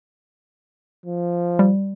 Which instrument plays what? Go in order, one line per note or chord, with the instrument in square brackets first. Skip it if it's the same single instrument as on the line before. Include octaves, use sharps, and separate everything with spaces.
[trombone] F3
[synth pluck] G3